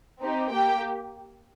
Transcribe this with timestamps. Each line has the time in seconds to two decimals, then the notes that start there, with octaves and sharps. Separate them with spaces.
0.20 C4 D#4 G4
0.51 A#3 G4 G5